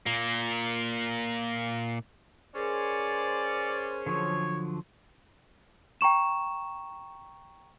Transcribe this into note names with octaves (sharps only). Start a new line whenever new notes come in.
A#2 A#3
C#4 G#4 A#4 C5 D5
D3 F3 F#3 C#5
G5 A#5 C#6 E7